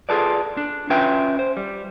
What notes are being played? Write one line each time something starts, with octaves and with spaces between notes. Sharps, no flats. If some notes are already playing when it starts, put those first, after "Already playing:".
F4 G#4 A4 B4 D5
D4
C#4 F4 B4 E5 G5
C5
G3